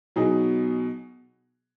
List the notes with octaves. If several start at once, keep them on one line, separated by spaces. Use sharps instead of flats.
B2 F#3 B3 D#4 G#4